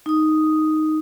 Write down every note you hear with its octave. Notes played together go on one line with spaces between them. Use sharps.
D#4 D#6